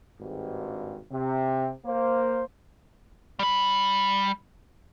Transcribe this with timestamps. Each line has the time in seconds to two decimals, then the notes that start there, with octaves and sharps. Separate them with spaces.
0.20 G#1 G2
1.12 C3
1.86 A#3 C5
3.39 G3 B5